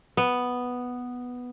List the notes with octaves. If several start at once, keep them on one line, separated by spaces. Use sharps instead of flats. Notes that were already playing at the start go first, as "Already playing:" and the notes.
B3